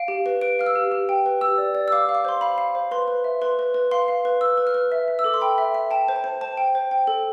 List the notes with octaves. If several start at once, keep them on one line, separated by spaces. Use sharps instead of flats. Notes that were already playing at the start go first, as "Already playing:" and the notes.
Already playing: F5 D7
G4
B4
B4 D7
F5 F6
E6
G4
G4
G5
B4
G4 E6
D5
D5
E6
F5 D6
F5
D6
C5 C6
F5 B5
F5
C5
B4 C6
B4
E5
B4 C6
B4
B4
F5 C6
F5
B4
B4 E6
B4
F6
B4
E5
E5
E6
A4 D6
C6
G5 B5
E5
E5
G5 A5
C5
A5
C5
C5 A5
G5
C5
G5
A4